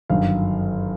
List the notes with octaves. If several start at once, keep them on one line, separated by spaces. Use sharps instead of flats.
G1 F#2 D#3 F5